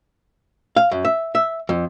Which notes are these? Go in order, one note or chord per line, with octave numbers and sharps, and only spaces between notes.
F5
F#2
E5
E5
F2